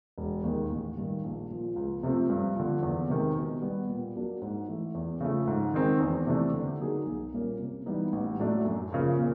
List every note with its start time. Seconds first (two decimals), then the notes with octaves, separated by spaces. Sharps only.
0.18 E1
0.44 D#2 D#3 G#3
0.70 A1
0.97 G2 D#3
1.24 A#1
1.50 A#2 F3
1.76 C#2
2.03 C3 F3 A3 C4
2.29 G2
2.56 D3 F3
2.83 E2
3.09 C3 D#3 G#3
3.35 B2
3.62 G3 B3
3.89 A#2
4.15 F#3 A#3 D4 F#4
4.42 G#2
4.68 E3 A3
4.95 E2
5.20 C#3 F3 A3
5.47 G#2
5.74 D#3 G#3 C4 D#4
6.01 E2
6.27 C3 E3 A3 D4
6.54 D3
6.80 F#3 A#3 D#4 G#4
7.06 B1
7.33 A#2 G3 A#3 C#4
7.60 C3
7.86 E3 G3 B3 D#4
8.13 A1
8.39 A2 F#3 A3 D4
8.65 F#2
8.92 C#3 F3 A#3
9.19 A#2